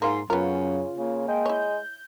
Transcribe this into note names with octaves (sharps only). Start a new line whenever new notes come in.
G#2 A#3 F4 C6
F#2 C#3 B3 F4 A#4
C#3 A#3
G#3 G5
E4 C#5 G6